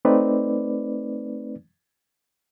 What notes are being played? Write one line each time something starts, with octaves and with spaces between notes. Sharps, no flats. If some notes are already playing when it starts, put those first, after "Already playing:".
A3 C4 D#4 B4 D5